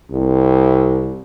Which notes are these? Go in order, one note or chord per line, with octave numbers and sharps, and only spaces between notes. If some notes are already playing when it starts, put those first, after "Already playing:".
C2